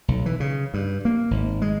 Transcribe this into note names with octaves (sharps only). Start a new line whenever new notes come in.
B1
E3
C#3
G2
A#3
G#1
G#3